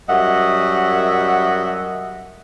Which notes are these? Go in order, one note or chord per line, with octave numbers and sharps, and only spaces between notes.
F#2 G3 D#5 E5 F#5